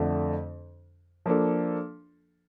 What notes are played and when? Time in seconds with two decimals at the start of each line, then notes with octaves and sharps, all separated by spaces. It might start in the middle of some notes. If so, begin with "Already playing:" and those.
Already playing: F2 D3 A3 D4
1.26 F3 A#3 D4 A4